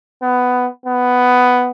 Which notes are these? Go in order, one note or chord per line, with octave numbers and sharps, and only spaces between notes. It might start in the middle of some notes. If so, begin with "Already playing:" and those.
B3
B3